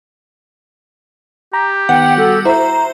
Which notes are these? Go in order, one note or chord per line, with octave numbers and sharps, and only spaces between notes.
G4 A#5
D#3 B3 F#5 G5
G3 F#4 A4
E4 C5 E5 A#5